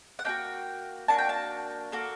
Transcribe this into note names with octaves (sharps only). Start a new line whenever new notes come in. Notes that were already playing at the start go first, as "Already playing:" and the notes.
F#5
A#3 D4 F#4 G5
A#3 D4 F#4 A5
G5
A5
A#3 F#4 A4